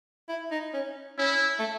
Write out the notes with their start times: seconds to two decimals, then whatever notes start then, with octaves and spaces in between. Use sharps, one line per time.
0.29 E4
0.51 D#4
0.74 C#4
1.18 C#4 E4
1.59 A3